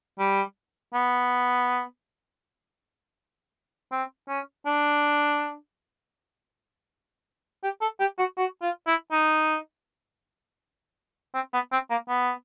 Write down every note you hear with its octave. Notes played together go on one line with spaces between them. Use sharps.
G3
B3
C4
C#4
D4
G4
A4
G4
F#4
F#4
F4
E4
D#4
C4
B3
C4
A#3
B3